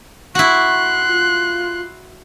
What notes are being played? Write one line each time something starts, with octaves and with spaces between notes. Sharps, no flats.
E4 F#4 C6 C#6 F#6
F4